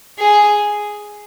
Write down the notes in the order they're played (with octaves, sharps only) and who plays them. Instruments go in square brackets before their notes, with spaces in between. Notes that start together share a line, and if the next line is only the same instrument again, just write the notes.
[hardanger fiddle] G#4